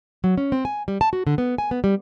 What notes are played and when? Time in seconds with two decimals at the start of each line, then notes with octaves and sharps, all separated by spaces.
0.24 F#3
0.38 C#4
0.52 C4
0.65 G#5
0.88 G3
1.01 A5
1.13 F#4
1.27 D3
1.38 B3
1.58 G#5
1.71 B3
1.84 G3